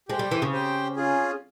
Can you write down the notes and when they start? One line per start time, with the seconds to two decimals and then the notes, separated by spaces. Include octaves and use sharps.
0.08 G#3 G4 C5 G5
0.19 G3
0.31 E3
0.42 C#3
0.53 G4 C5 G5
0.96 C#4 F4 G#4